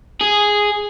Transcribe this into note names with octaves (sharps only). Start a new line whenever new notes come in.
G#4